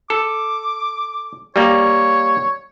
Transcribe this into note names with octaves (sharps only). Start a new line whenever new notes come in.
A4 D6
G3 A#3 C#5